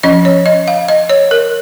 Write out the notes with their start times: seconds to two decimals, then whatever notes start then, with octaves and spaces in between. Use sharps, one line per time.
0.03 F3 C#4 D#5
0.25 C#5
0.46 D#5
0.68 F5
0.88 D#5
1.10 C#5
1.31 A#4